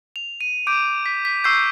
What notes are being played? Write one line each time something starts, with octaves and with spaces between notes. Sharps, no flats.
F7
D#7
D6 G6 D7
B6
B6
C#6 E6 G6 C7